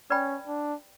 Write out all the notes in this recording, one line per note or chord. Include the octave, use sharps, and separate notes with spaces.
C#4 B4 D5 G5 B5
D4